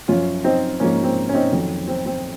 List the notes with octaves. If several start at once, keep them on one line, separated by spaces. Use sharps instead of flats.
F#2 F3 C#4 F4
C4 D#4
G#2 F3 A#3 C#4
A#3
C4
C#4
C4 D#4
F2 D#3 F#3
C4
C4